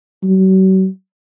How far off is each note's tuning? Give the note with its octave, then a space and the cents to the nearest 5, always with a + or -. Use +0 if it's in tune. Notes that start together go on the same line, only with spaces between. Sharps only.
F#3 +40